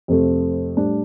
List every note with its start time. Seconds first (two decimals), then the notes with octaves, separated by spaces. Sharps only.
0.08 F2 C3 A3 C4
0.77 A2 G3 D4